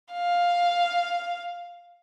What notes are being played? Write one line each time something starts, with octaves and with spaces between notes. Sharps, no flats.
F5